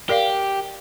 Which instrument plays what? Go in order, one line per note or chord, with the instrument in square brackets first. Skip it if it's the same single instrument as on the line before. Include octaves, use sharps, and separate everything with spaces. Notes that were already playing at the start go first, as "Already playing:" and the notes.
[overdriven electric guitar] G4 [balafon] A#4 D5 F5